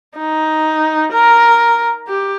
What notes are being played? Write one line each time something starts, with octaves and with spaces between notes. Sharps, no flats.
D#4
A#4
G4